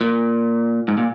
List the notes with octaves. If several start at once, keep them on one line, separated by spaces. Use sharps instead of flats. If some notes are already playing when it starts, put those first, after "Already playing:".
A#2
G#2
A#2